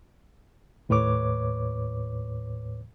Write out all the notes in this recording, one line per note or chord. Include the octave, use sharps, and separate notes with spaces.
D#2 A2 B4 C#5 D6